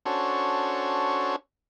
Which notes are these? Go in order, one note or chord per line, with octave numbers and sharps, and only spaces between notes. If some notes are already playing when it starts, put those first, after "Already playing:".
C#4 D4 F#4 A4 C5 C#5